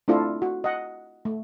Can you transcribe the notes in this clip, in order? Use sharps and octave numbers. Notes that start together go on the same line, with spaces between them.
A3 C4 D4 E4 F4 A4
F#4
D#5 F#5
A3